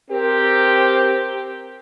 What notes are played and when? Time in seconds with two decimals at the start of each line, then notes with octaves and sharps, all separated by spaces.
0.10 C4 G4 A#4